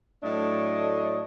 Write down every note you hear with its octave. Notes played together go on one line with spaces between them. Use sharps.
A2 F#3 A3 D4 C#5 D#5